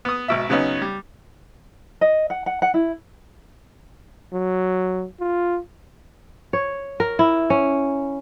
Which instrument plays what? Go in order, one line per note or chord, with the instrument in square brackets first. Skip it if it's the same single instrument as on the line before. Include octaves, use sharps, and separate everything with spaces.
[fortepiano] B3 D#6
G#1 B2 E5
C#3 F#3 B3 C#4 D#4
G3
[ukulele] D#5
F#5
F#5
F#5
E4
[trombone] F#3
F4
[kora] C#5
A#4
E4
C#4